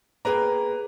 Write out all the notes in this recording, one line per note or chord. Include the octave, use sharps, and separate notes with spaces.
A#3 G#4 B4 G5 A#5